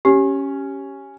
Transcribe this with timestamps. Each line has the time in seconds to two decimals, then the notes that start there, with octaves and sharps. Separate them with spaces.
0.05 C#4 G4